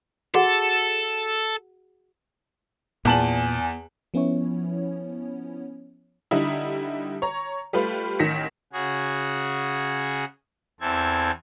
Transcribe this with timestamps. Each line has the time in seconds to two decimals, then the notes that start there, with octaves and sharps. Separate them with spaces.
0.34 F#4 G#4 A4 F#5
3.05 E2 A#2 G#5 A5 F#7
4.14 F3 B3 C#4 E4 C#5
6.31 D3 G3 D#4 E4
7.22 C#5 A#5
7.73 G3 A3 F4 B4
8.19 A1 D#3 A#6 B6 C#7
8.73 C#3 F#4 G#4
10.81 E2 E3 C4 A4 G#6